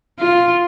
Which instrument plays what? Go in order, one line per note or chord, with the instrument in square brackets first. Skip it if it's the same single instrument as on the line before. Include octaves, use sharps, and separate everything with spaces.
[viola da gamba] F4